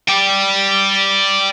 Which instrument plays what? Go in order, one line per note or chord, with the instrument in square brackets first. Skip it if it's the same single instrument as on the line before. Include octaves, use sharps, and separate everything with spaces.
[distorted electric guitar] D5 G5